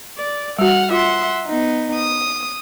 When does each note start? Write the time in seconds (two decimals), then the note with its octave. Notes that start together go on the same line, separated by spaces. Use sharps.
0.17 D5
0.59 G3 F#4 F#5 F6
0.91 F4 E5 F#5 C6
1.46 B3 D#4
1.95 D#6